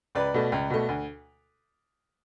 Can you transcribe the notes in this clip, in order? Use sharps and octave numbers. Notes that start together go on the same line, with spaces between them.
C#2 B4 D5
B2 A3
C#2
B2 A3
D2